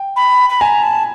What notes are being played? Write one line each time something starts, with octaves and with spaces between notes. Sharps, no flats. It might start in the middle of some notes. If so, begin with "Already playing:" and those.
Already playing: G5
B5
B5
G#5 A#5
A5